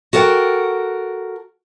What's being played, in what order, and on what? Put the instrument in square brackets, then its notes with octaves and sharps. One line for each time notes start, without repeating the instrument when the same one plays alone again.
[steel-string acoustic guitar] F#4 A4 A#4 C#5 F#5 G5